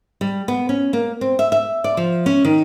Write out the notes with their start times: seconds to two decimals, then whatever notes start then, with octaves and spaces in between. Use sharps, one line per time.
0.21 G3
0.48 B3
0.69 C#4
0.93 A#3
1.21 C4
1.39 E5
1.52 E5
1.84 D5
1.97 F3
2.26 C#4
2.45 D#3